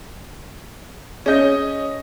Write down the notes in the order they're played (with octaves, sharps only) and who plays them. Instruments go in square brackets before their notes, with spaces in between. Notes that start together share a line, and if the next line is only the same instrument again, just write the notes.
[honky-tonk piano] C#4 D#5 [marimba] G#4 C#5 G6